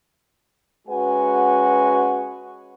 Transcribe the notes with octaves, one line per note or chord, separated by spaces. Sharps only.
G#3 C#4 F#4 B4 F#5 G#5